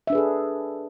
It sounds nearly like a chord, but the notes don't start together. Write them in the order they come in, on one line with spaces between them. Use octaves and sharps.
E5 D4 B4 G#4 A4